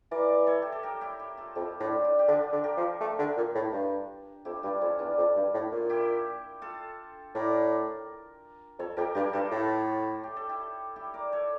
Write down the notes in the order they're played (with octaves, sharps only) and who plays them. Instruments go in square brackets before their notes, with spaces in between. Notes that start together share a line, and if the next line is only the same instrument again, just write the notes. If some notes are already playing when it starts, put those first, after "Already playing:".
[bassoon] E3 [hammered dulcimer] A#4 D5
[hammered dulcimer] A4 C#5
G4
A4
G4 A#4
E4 G4
E4 G4
F4 A4
[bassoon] F2 [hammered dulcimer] E4 G4
[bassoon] A2 [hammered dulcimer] D4 F4
[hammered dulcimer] D4 F4
G4
[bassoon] D3 [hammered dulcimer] D4 F4
[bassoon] D3
[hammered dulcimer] G4 A#4
[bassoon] F3
A3
D3
A#2
A2
G2
[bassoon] F2 [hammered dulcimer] E4 G4
[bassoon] G2 [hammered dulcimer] D4 F4
[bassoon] F2 [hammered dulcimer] C#4 E4
[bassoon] E2 [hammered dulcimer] D4 F4
[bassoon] F2
G2
A2
A#2
[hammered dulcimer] E4 G4
F4 A4
[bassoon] A2 [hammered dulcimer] A#4 D5
[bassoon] F2 [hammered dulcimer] A4 C#5
[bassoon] F2 [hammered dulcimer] G4 A#4
[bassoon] G2 [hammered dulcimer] G4 A#4
[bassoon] G2 [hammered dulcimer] F4 A4
[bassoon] A2
[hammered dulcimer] G4
A4
E4 G4
E4 G4
A#4 D5
A4 C#5